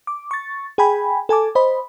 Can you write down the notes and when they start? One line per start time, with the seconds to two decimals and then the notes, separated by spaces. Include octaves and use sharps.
0.07 D6
0.31 C#6 A6
0.78 G#4 G5 G#5 B5
1.29 A4 G#5 A5 D6
1.55 C5 D#5 B5